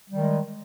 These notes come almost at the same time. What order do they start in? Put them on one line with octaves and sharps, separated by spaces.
G3 D#3 G#3